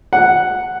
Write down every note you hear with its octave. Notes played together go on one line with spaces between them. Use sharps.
F#5